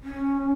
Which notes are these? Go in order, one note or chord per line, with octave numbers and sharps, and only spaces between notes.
C#4